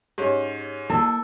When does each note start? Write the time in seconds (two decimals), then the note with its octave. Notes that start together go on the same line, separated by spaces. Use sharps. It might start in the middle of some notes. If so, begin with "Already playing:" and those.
0.18 G#2 C#4 G4
0.90 A#3 E4 A4